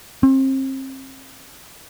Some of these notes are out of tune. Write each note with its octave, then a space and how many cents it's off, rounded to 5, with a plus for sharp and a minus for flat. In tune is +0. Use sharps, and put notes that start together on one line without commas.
C4 +35